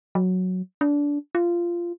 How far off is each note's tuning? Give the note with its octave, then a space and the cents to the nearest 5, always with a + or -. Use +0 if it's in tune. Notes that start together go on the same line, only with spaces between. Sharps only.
F#3 -5
D4 -20
F4 -15